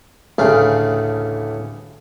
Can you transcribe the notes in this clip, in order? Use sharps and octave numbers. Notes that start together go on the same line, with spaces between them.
A1 D2 A2 C#3 F5